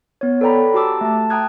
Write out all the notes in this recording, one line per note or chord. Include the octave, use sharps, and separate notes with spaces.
B3 C#5
A4 B4 D5 G5 A#5 B5
F#4 G4 A5 D6 E6
A3 A5
G5 A5 A#5 D#6 F#6 G#6